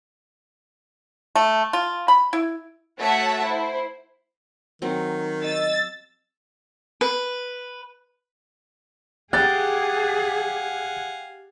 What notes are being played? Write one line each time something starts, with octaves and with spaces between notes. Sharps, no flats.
A3
F4
B5
E4
A3 F#4 C#5 E5 F#5 A5
E4 C5
D#3 F#3 C4
D#5 E6 A6
B4
G4 G#4 F5 F#5 G#5 F#6 A6